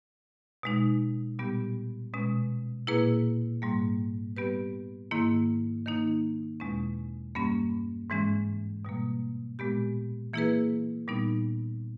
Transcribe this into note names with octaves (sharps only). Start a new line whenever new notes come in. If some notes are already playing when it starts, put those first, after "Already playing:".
B2 G#3 D#4
A#2 G3 B3 G4
B2 G#3 C#4
A#2 A#3 E4 G#4 B4
G#2 G3 A#3
G3 B3 G4 B4
G#2 D#3 A#3 E4
D#3 A#3 D#4
E2 B2 G#3 C#4
G2 G3 A#3 C#4
G#2 E3 G#3 C#4
B2 G3 A#3
A#2 G#3 B3 G4
E3 A#3 E4 G#4 B4
A#2 G3 B3 D#4